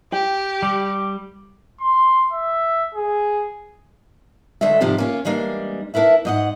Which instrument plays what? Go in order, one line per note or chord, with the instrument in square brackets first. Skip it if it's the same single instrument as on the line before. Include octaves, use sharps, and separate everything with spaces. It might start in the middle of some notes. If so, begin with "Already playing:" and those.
[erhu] G4 [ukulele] G5
[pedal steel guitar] G3 [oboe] D6
[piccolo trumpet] C6
E5
G#4
[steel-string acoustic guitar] F#2 D3 G#3 A3 E5
G#2 C3 F3 D4 G4
A#3 C#4 F4
E3 G3 G#3 A#3 C#4 D4
D4 E4 A#4 B4 E5
G#2 D#5 F#5